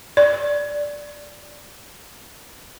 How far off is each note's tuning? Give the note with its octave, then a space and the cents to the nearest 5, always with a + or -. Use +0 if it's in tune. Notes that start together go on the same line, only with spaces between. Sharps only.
D5 +0